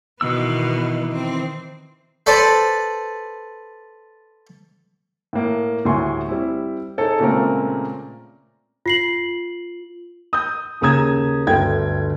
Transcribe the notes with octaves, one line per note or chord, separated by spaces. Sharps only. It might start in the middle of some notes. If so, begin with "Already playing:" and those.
B2 D#3 E3 B3 E6
C4
A4 B4 C5 D5
A2 A#3
D2 A2 G3 G#5 C6 C#6
G3 C4 E4
D#4 G#4 A4 C#5
A#2 C#3 G#3 A3 C4 A#4
F4 C7 F#7
D#6 G6
D#2 C#3 A#5 D#6 G#6 E7
G1 D2 G5 G#6